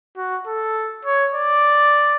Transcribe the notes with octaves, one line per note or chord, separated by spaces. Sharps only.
F#4
A4
C#5
D5